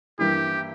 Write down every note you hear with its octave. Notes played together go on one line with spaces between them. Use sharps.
G2 E3 A#3 E4 G4